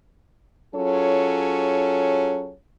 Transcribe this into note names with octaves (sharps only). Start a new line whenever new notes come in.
F#3 C#4 F4 G#4 A4 C#5